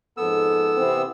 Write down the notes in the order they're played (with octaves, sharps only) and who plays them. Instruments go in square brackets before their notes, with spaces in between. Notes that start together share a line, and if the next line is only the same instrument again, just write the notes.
[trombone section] F2 G#2 A4 [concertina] B3 E6
[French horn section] C3 E3 C4